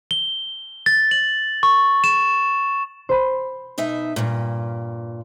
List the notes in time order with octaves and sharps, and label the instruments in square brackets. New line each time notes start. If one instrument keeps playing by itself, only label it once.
[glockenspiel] G7
A6
F#7
C#6
E7
[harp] C5 B5
[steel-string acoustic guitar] B2 D#4 E5
G2 A#2